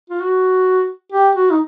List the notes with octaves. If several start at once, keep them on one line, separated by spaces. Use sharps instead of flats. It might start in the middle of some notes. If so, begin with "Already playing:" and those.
F4
F#4
G4
F#4
D#4